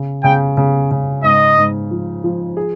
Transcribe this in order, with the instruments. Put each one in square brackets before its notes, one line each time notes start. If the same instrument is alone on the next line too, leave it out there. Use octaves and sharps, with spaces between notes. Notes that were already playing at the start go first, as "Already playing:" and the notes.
Already playing: [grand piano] C#3
[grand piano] C#3 [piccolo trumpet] G5
[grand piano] C#3
C#3
[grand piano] G#2 [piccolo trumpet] D#5
[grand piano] G#2
F3
F3
G#4